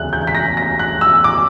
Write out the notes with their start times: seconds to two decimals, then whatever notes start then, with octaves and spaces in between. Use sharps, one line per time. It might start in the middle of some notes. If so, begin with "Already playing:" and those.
Already playing: E1 D2 C#3 F#6
0.13 G6
0.27 B6
0.35 A#6
0.57 A#6
0.79 F#6
1.01 E6
1.24 D6